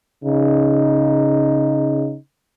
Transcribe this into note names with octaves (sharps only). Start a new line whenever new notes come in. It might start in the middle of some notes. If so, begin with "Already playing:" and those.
C#3 D#4